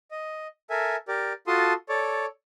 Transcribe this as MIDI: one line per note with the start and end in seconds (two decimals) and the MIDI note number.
0.11 0.47 75
0.70 0.96 69
0.70 0.96 70
0.70 0.96 76
0.70 0.96 80
1.08 1.33 67
1.08 1.33 70
1.08 1.33 74
1.47 1.73 65
1.47 1.73 66
1.47 1.73 69
1.47 1.73 81
1.47 1.73 84
1.47 1.73 87
1.89 2.26 69
1.89 2.26 73
1.89 2.26 74